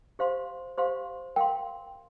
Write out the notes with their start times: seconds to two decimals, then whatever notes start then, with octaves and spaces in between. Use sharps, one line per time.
0.19 G4 C5 F5 C6
0.78 G4 C5 F5 C6
1.36 A#4 F5 G5 C6